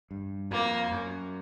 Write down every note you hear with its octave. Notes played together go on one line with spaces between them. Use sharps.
G2
F2 A#3
F#2